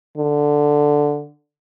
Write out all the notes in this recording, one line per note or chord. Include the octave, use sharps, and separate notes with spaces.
D3